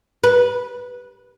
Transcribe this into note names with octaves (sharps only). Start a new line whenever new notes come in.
B4